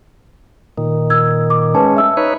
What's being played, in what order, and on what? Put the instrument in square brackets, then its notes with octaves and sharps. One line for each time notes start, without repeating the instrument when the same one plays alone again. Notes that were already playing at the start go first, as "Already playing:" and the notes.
[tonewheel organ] A#2 D#3
[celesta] E6 G#6
D6
[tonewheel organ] G#3 C#4 [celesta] B4 A5
[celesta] E5 E6
[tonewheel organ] D#4 B4 C#5